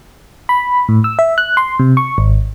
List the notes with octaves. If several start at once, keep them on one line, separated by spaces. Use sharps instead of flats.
B5
A2
E6
E5
F#6
C6
C3
C#6
G#1